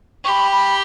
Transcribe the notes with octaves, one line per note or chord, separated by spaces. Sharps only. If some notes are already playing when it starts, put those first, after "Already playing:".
G4 B5 C#6
B5